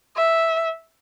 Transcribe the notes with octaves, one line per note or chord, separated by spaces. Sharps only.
E5